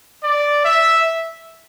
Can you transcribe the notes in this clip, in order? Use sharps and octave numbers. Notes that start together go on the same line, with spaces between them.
D5
E5